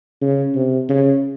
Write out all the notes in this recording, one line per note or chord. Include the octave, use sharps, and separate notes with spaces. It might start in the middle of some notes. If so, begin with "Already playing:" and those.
C#3
C3
C#3